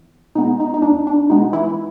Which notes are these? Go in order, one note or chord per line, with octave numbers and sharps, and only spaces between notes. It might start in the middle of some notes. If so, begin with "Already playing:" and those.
Already playing: E2
B2 G#3 B3 D#4
D#4
D#4
E2 D4
D4
B2 G#3 B3 D#4
E3 E4